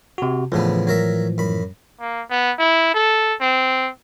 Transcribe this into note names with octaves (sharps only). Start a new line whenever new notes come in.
C3 F#4
D2 A2 C#3 E3 F3 B3
F#3 A#4 E5
F#2 B5
A#3
B3
E4
A4
C4